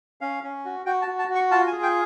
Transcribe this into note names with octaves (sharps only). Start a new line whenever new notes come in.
C#4 F5
C#4
F#4
F#4 G5
A5
F#4
A5
F#4
C#6
F4 A5
G#5
G#4
G5